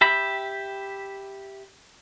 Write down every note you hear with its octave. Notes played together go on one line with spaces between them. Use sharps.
G4 E5 B5